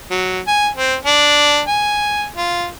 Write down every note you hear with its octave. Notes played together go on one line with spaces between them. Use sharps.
F#3
G#5
C4
D4
G#5
F4